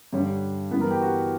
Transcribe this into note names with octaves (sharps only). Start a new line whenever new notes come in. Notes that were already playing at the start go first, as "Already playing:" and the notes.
G2 D3 G3 C#5
G2 E3 B3 B4
A#4
G4
F#4